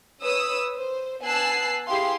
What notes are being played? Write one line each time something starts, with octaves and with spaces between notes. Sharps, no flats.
B4 C#5 D#6 E6
C5
B3 G#5 A5 E6 F#6 C7
E4 G4 G#4 F5 C6